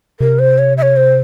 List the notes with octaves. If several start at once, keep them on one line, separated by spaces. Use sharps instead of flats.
C3 A#4
C5
C#5
E5
C#5
C5